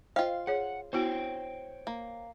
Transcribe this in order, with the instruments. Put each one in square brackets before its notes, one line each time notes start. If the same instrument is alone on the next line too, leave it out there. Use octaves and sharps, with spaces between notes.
[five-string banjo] F4 F5 [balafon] C5 D#5 G5
[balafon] G#4 C#5 [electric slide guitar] F#5
[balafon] B3 E4 F#4 [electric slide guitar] C5 C#5 G5
[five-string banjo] A#3